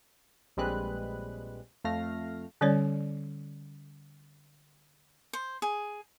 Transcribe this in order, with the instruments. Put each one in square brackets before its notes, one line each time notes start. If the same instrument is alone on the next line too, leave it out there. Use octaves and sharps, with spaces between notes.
[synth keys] A#1 G3 G#3 C4 B4 F#6
F2 A3 F5 F6 A#6
[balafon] D3 G3 C#4 C#5 D5
[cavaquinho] C5
G#4